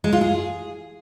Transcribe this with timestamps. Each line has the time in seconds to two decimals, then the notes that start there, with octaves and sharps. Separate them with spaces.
0.04 G#3
0.13 F4
0.21 G#4